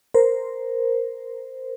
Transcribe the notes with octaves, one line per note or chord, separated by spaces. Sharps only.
A#4 C5